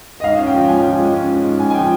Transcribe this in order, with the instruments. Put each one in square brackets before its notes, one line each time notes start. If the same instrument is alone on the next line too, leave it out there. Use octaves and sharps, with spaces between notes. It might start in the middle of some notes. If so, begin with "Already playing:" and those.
[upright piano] D#5
G#2 F5
C#4
G5
F3
G#2 G#5
F3
G#3
C#4
C#4
G#2
G#2 G#5
G#5
F3 G5